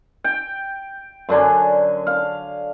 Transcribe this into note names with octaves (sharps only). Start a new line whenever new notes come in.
G5
F#2 D3 D4 G#5
F5